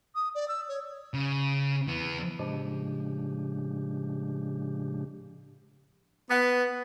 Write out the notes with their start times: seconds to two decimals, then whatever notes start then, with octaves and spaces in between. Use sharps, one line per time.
0.15 D#6
0.35 D5
0.48 E6
0.69 C#5
1.14 C#3
1.87 E3 B3
2.39 A2 C#3 F3 G#3 D4 G4
6.31 B3